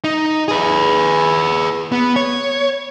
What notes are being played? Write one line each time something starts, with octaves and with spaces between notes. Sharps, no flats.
D#4
G#4 B4
B3
C#5